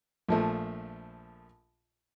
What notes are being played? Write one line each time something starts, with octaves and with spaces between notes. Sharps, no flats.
A#1 F3 A3